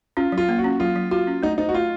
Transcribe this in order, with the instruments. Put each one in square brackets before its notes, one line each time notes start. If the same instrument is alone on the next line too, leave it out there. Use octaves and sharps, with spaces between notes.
[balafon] C#4 [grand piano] F4
[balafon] F#3
[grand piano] F4
[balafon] A#3
[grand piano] F#4
[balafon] C#4
[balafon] F#3 [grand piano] F4
[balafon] F#3
[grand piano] F4 [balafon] F#4
[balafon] C#4
[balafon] A3 [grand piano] D#4
[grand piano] D#4 [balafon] C5
[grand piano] F#4
[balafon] A3 [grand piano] F4